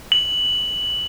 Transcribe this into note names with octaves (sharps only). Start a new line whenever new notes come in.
F#7